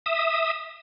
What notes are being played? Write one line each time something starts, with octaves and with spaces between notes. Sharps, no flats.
E5 D#6